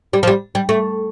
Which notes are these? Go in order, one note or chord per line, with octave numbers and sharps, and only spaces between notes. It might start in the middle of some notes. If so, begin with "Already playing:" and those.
G3
F3
G3
G3
A3